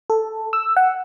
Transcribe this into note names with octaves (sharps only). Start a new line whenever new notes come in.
A4
E6
F#5